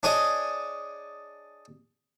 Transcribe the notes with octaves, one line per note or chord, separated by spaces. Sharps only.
D4 G#4 C#5 D#5